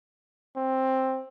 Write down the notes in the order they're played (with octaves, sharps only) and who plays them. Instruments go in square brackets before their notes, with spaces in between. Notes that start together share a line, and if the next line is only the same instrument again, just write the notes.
[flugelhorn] C4